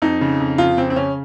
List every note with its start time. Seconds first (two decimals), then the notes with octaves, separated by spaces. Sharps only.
0.02 F2 D#4
0.21 C#3
0.40 F2
0.58 F2 F4
0.77 C#3 C4
0.90 C4
0.96 C#3 C#4